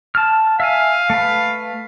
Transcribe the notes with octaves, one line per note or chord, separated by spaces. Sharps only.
A5 F6
E5 F5 G#5
A3 B4